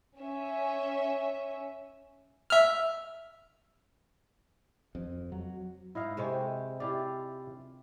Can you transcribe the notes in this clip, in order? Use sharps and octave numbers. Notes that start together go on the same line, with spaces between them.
C#4 E5
E5 F6
F2
F#3
G#2 D#4 E4 D#5 F5
C3 G#3 G4 A4 C5 C#5
E4 F4 G4 D5